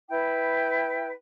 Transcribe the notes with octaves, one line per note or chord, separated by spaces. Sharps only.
E4 B4 G5